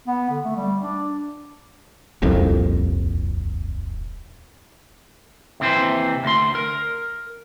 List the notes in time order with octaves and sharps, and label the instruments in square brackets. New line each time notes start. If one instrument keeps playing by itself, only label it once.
[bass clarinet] B3
D3
A3
G3
D4
[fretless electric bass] D#1 C2 F2
[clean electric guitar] D#2 C3 E3 C5
D2 C6
A#4